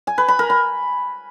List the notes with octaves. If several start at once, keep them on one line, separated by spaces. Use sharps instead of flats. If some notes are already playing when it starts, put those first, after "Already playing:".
G#5
B4
B5
A#4
B5